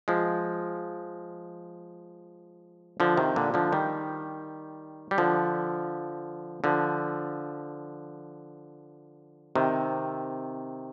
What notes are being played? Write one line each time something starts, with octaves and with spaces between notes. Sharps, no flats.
F3 G#3
D3 F3
C3 D#3
A#2 D3
D3 F3
D#3 G3
G3
D3 F3
D3 F3
C3 D#3